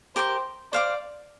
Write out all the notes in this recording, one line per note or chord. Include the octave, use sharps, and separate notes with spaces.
G4 A#4 C5 G5 D6
C5 D5 F5 D6